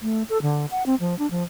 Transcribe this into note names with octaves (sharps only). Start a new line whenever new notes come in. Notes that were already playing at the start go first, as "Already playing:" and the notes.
A3
A4
D3
F#5
C4
F3
D4
F3